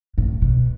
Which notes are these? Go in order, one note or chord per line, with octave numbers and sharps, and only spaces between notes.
A2
B2